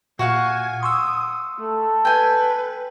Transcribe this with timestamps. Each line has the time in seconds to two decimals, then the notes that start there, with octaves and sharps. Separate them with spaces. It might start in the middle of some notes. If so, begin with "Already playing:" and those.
0.19 A#2 F#4 F5 F#5 G#5
0.83 C6 C#6 D#6 E6
1.59 A3 A4
2.05 B4 G5 G#5